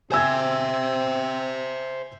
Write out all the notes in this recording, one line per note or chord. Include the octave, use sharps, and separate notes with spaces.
C4 C5 E5 G#5 E6 G#6